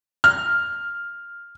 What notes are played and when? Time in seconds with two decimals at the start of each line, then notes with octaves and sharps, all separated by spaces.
0.24 F6